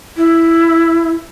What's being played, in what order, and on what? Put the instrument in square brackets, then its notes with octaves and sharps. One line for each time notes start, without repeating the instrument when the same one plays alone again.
[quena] E4